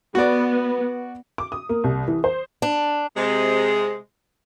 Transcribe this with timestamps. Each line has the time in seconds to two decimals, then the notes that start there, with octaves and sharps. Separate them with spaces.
0.15 B3 F#4 D5
1.38 D6
1.52 D#6
1.69 A#3
1.84 C2
2.08 E3
2.24 C5
2.62 D4
3.16 C3 G#3